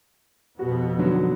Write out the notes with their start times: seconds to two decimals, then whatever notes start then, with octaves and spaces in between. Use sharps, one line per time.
0.59 F2 B2 B3 F#4
0.98 D3 D#3 F#3